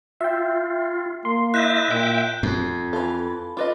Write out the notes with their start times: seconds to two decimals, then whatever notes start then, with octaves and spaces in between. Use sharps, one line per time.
0.21 F4 E5 G5
1.25 A#3 C6
1.54 E4 D#5 E5 F#6 G6
1.90 A#2 E5 G5
2.43 F2 C4 C7
2.93 E3 F4 A4 A5 B5
3.57 F4 B4 D#5 B5 D6 A6